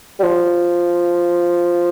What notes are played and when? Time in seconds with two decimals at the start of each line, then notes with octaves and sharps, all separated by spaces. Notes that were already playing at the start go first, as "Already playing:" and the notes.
0.20 G3
0.24 F3